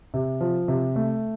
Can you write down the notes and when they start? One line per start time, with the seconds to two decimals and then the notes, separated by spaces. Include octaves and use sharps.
0.14 C3
0.40 F3
0.68 C3
0.96 A3